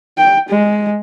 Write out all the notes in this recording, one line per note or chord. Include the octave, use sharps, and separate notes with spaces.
G5
G#3